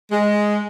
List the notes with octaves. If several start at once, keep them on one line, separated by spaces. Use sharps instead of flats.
G#3